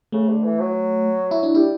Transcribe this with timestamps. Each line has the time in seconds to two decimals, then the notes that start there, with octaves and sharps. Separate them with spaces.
0.12 C#3 A3
0.29 D3
0.44 E3
0.59 F#3
1.31 E4
1.43 D4
1.55 G3 E4